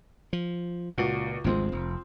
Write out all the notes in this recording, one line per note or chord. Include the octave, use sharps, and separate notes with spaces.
F3
C#2 A#2 F#4
G#1 D2 F3 G#3 C4
F1